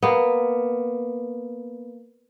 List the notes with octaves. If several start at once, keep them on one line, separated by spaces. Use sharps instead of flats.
A#3 B3